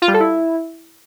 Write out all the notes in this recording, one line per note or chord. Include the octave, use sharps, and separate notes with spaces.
F4
G3
A4
E4